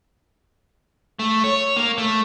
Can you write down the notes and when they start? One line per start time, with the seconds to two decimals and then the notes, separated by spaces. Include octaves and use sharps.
1.19 A3
1.44 C#5
1.76 A#3
1.98 A3